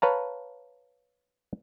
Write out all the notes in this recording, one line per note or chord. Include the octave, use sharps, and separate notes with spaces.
B4 C#5 F5 A5 A#5